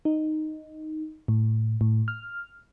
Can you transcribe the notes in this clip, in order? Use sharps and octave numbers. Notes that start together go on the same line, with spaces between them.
D#4
A2
A2
F6